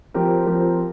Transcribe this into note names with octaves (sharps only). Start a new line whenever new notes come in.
F3 C4 G4 A#4
F3 C4 G4 A#4